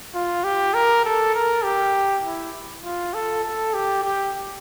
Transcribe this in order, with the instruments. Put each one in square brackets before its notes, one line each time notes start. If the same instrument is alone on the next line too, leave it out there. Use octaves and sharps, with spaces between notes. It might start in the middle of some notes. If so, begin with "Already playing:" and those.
[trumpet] F4
G4
A#4
A4
A#4
G4
E4
F4
A4
A4
G4
G4